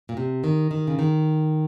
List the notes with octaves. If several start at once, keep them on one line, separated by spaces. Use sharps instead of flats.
A#2
C3
D#3
D#3
C#3
D#3